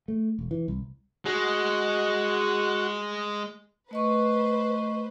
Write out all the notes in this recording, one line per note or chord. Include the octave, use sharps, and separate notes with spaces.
A3
E1
E3
C2
G#3 F#4
A3 B4 C5 D#5 C#6